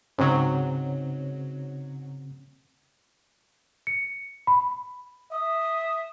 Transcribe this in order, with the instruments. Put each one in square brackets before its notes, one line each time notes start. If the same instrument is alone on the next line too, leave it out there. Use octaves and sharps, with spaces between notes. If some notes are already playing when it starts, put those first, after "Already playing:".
[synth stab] G#2 F#3 [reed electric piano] C#3 C4 C#4
[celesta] C#7
B5
[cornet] E5 [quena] D#6